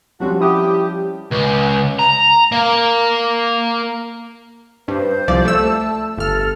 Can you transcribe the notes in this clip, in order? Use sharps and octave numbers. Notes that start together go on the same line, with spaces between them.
F3 G3 C4 C#4 F#4
E4 G4 D#6
C#2
A#5
A#3
G2 C5
C2 F3 D5
A3 E6
A5
G1 A4 F6